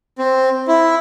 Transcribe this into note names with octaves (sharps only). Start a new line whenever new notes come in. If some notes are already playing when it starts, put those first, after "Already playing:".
C4
E4